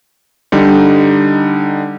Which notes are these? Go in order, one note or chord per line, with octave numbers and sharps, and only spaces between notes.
D3 G3 D#4